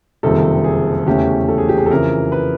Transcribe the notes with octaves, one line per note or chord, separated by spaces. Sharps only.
F#1 F2 C3 D#3 G3 A4
G#4
E2 C#3 E3 A3 C#4 G4
A4
G#4
G4
G#4
A4
F2 C#3 E3 A#4
B4